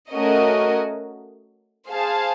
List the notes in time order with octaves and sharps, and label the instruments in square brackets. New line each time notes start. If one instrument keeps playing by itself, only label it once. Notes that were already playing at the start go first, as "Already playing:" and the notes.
[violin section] A3 C#4 F#4 A#4 D#5
G#4 C5 F5 A5